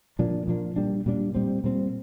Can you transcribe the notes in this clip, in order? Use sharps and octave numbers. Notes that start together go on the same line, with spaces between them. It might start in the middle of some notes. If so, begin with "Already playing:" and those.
A#2 F3 A#3 D4
A#2 F3 A#3 D4
A#2 G3 D4
A#2 G3 D4
A#2 G3 C4
A#2 G3 C4